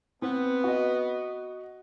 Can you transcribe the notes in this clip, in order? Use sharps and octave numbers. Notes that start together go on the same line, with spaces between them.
B3 C4
F#4 D#5